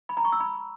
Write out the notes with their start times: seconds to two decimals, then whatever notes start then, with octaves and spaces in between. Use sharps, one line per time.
0.09 B5
0.17 A#5
0.25 C#6
0.32 E6
0.40 B5